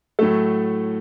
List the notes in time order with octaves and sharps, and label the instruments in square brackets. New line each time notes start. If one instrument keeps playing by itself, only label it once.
[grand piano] A2 F#3 A3 A4